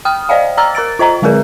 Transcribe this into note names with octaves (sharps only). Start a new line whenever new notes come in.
G5 D#6 F6
C5 D5 D#5 F5 G5
D5 A#5 E6 F6 A6
A#4 A#5 A6 D7
F4 C5 D#5 A#5
D3 G#3 C4 G#4 A#4 B4